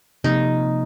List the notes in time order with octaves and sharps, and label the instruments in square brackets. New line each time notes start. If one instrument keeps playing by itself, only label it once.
[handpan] C3 F3 A#3 [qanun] D#4